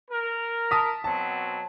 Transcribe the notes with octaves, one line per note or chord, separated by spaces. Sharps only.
A#4
A5 D#6 B6
B2 F#3 C4 A5